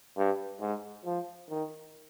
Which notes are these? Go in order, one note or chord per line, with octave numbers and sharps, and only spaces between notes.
G2
G#2
F3
D#3